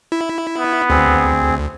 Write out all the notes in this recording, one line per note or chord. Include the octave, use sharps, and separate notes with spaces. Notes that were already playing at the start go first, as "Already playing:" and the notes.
E4
B3
D2 C4 G#4